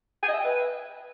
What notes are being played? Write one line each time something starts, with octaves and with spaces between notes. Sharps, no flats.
G#5
D#5
E5
G5
B4